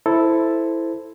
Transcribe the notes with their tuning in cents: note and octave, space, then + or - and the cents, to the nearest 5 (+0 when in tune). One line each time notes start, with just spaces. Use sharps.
E4 +0 A4 +0 C5 -5